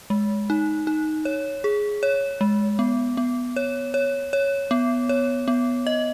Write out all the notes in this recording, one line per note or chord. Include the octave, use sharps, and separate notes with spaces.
G#3
D#4
D#4
C#5
G#4
C#5
G#3
B3
B3
C#5
C#5
C#5
B3
C#5
B3
D#5